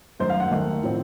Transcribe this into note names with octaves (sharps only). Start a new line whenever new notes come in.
F#2 D#3 A3 C5
F5
F#5
D#2 D#3 A3
A2 F3 C4